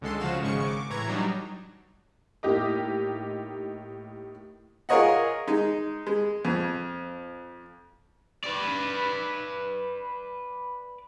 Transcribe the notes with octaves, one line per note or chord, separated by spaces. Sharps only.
C#2 D3 G#3 A4 C6
C#3 F3 F#4 F5 E7
G#1 G#2 C#3 G#3 C#6 C#7
D6
A2 E3 A#5 C#6 G#6
F#3 G3 D4 D#4
A2 A#3 D#4 G4 D#5 D6
F4 G#4 A#4 C#5 D#5 F#5
G#3 D#4
G#3
F2
B4 D5